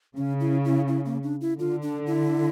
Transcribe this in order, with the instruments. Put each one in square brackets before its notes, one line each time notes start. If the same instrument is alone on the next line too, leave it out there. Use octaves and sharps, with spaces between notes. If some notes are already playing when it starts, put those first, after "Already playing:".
[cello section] C#3 [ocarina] C#4
[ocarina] E4
E4
E4
A#3
D4
E4
[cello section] D3 [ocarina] F4
[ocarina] D4
E4